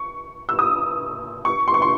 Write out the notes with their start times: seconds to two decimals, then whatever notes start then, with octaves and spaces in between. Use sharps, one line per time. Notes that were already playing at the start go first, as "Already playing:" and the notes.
Already playing: C#6
0.49 E6
0.59 D#6
1.45 C#6
1.68 C6
1.74 C#6
1.82 C6